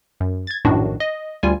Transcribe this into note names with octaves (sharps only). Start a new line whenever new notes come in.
F#2
G#6 A6
A#1 F#2 A2 D#3 D4 F#4
D#5
D2 G3 F4 G#5